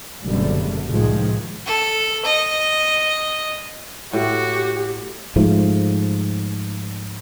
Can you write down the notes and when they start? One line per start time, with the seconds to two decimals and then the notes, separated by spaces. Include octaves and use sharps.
0.23 F#1 F#2 B2 D3 G3 A3
0.87 C2 A2 D#3 F3 G#3
1.66 A4
2.25 D#5
4.13 A2 F#4 G4
5.36 G#2 F3 A3